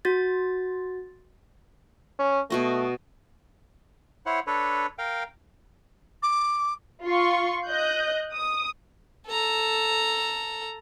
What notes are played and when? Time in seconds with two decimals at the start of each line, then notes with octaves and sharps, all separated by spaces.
0.05 F#4 A6
2.19 C#4
2.50 B2 A3 F#4 D#5
4.26 E4 C5 C#5 F#5
4.47 D4 A4 B4 C#5
4.98 A#4 F5 G5
6.22 D6
7.04 F4 C6 C#6
7.66 D#5 F#6 G6
8.33 D#6
9.28 A4 A#5